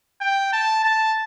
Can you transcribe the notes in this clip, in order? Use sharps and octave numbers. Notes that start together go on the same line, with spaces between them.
G5
A5
A5